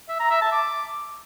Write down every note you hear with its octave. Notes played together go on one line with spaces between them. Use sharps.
E5
A#5
E5
A5
D6